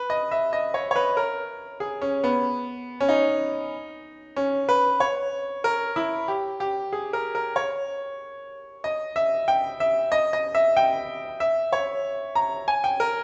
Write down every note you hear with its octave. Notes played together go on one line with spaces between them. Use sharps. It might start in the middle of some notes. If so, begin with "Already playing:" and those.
Already playing: B4
D#5
E5
D#5
C#5
C#5
B4
A#4
G#4
C#4
B3
C#4
D#4
C#4
B4
C#5
A#4
E4
G4
G4
G#4
A#4
A#4
C#5
D#5
E5
G5
E5
D#5
D#5
E5
G5
E5
C#5
A#5
G#5
G5
A#4